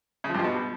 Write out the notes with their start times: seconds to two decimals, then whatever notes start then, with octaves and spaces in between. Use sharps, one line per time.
0.24 C#3
0.29 F3
0.34 G2
0.39 F3
0.44 B2